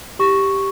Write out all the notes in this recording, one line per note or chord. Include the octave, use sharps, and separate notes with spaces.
G4 C#6